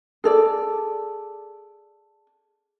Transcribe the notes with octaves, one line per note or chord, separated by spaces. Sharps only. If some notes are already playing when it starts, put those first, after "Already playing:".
G#4 A4 D5